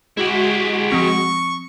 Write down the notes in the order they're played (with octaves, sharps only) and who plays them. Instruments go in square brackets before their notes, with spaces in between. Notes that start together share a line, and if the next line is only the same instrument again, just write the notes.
[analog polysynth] G#3 F#4 [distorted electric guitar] E4 G4
[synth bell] F3 C4 [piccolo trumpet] C#6